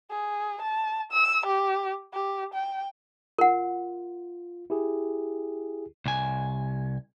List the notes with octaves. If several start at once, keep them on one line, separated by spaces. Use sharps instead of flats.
G#4
A5
E6
G4
G4
G5
F4 A#4 F#5
E4 G4 G#4
C2 G#5